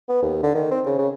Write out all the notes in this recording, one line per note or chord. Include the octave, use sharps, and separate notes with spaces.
B3
D#2
D3
D#3
C4
C#3
C#3